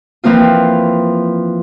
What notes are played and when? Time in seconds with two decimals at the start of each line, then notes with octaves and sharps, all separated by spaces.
0.24 E3 F3 A#3 C4 F4